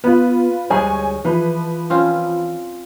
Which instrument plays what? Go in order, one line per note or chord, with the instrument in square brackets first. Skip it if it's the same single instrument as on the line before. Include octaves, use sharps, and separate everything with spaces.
[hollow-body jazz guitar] B3 [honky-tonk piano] F4 B4
[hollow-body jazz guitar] D2 G3 G#3 [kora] G#4 [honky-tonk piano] C#5 G#5
[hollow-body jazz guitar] E3 [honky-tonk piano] F3 B4
[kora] C4 C#4 F4